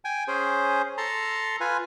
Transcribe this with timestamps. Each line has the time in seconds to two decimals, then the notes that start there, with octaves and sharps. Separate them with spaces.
0.05 G5 G#5
0.28 C#4 G#4 C5
0.98 A4 A5 A#5 C6
1.60 F4 B4 G#5